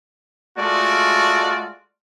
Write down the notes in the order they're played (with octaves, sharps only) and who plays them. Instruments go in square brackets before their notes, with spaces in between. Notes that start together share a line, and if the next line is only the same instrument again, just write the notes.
[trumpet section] G#3 A3 F4 F#4 D5